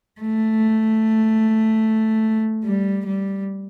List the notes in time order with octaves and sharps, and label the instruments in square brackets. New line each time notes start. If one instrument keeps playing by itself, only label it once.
[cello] A3
G3
G3